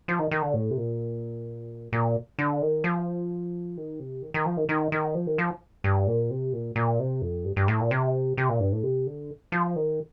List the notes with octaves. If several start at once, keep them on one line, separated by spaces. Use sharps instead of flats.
F3
D#3
D#3
D3
A2
C3
A#2
A#2
D3
D#3
F3
D#3
C3
D#3
D#3
F3
D#3
D#3
D#3
F3
D#3
F3
G2
A#2
C3
A#2
A#2
C3
F2
G2
G2
A2
A#2
C3
C3
A#2
G2
A2
C3
D3
F3
D#3